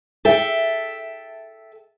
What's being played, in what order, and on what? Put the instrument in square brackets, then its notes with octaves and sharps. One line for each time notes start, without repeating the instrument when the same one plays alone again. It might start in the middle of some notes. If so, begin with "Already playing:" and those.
[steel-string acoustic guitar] A4 E5 G5